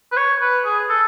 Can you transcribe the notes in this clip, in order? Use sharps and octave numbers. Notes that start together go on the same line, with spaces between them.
B4
C#5
B4
G#4
A4